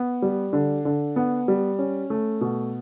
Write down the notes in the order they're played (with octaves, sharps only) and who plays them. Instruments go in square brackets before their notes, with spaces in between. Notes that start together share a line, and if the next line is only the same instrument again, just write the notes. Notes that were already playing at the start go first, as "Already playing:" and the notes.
Already playing: [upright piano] B3
G3
D3
D3
B3
G3
C#4
A3
B2